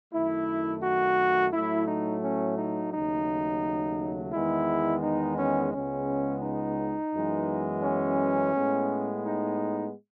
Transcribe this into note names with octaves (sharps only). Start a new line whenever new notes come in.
F#2 D#3 A3 E4
F#4
A2 F#3 A3 E4
D#4
C#4
D#4
D#2 C#3 F#3 A3 D#4
E2 D#3 G#3 B3 E4
D#4
C#4
C#2 C#3 G#3 B3 C#4
D#4
F#2 E3 G#3 B3
C#4
A2 G#3 B3
D#4